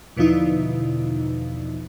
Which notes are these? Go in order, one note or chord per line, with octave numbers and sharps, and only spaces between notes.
E2 B2 D3 F3 D#4 E4